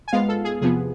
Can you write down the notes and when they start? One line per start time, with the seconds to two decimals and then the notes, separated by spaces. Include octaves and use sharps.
0.08 G#5
0.13 G#2 G#3 B3 F4 F5
0.29 A4
0.44 G#4
0.61 E2 C3 F3 B3 G#4